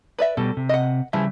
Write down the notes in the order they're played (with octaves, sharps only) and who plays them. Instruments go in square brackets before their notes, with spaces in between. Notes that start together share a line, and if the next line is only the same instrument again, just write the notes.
[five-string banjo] B4 D5 E5
[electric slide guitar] B2 G3 [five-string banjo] A4
[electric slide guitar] C3
[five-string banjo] D#5 F#5
[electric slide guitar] C#3 G3 E5 [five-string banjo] E3 F3 G#4